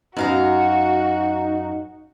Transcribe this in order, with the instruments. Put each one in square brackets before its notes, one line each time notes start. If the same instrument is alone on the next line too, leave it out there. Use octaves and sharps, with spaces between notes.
[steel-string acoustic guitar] F#2 F5 A#5 [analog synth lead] D#4 [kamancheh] F#4